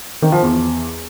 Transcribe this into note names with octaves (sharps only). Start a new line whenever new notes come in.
D#3
F3
E2